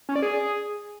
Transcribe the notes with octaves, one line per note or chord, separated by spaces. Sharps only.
C#4
D5
G#4